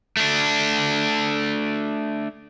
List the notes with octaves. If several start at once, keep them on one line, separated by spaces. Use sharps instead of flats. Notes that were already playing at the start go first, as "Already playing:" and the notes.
A3 D4